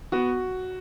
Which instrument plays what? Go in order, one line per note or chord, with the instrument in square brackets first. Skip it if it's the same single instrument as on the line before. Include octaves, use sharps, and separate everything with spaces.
[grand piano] B3 F#4